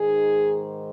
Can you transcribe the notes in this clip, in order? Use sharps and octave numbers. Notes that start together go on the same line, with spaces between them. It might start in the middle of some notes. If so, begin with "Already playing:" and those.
Already playing: G#2 D#3 G#4